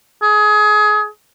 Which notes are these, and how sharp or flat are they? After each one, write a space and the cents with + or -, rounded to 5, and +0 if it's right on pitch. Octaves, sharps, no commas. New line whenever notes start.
G#4 +25